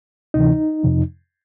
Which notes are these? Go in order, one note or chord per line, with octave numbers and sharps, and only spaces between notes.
D2 C3 E3 D#4
F2 C3 F3